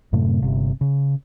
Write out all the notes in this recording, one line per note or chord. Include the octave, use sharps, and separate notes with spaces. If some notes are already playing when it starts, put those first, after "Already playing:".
F#2 A2 C3 A3
G1 C3
C#3